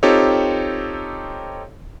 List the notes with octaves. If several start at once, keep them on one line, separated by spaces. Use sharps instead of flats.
C4 D#4 F4 G4 A4 C#5